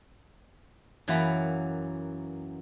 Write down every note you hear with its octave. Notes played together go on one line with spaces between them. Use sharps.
F#2 E3 A#3 F#4 B5